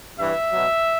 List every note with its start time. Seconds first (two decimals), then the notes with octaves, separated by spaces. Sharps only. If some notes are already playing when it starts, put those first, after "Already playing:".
0.18 G2 E3 E5
0.51 B2 F#3